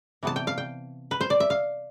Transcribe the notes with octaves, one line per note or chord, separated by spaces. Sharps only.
C3 E3 B3 A5
G5
F5
G5
B4
C5
D5
E5
F5